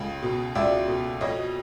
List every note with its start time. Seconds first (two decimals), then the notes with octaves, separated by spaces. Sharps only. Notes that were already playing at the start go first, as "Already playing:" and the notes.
Already playing: C#2 C#3
0.22 B2
0.55 C#2 D5 E5
0.88 B2
1.21 F2 C#5 D#5